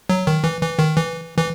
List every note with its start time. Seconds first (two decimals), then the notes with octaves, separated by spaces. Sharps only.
0.09 F#3
0.27 D#3
0.44 E3
0.61 E3
0.79 D#3
0.96 E3
1.39 E3